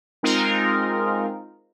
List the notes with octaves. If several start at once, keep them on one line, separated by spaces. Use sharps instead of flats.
G#3 C4 D#4 F4 A#4